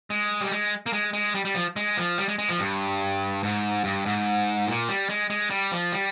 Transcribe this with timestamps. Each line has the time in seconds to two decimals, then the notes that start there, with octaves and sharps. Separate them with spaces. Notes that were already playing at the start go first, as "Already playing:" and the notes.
0.10 G#3
0.41 G3
0.52 G#3
0.86 A#3
0.93 G#3
1.13 G#3
1.35 G3
1.45 G3
1.55 F3
1.76 G#3
1.97 F3
2.18 G3
2.28 G#3
2.39 G#3
2.49 F3
2.59 G2
3.43 G#2
3.84 G2
4.06 G#2
4.68 A#2
4.88 G3
5.10 G#3
5.30 G#3
5.50 G3
5.72 F3
5.92 G3